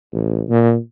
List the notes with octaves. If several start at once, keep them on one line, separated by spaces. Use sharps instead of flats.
A1
A#2